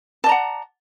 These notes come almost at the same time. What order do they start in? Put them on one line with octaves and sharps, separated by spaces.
A5 D5 A#5 F#5